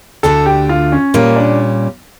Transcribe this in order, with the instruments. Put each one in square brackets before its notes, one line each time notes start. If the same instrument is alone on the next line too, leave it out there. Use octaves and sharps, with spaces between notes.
[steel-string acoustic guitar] D2 D3 A3 D4 [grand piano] A4
[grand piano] G4
F4
C#4
[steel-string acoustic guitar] A#2 G3 C#4 [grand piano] A#3
[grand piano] D4